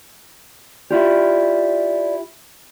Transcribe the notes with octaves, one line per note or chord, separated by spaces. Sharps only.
E4 F4 G4 D5